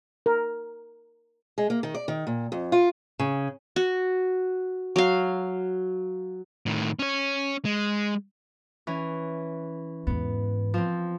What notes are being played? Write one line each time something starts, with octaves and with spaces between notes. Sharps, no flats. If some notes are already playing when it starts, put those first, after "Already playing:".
A#4
G#3
A#3
D#3
D5
D#3
A#2
F2
F4
C#3
F#4
F#3 F5
A2 D#3
C#4 C#5
G#3
E3 C#4
E2 G#2 B3
F3 C4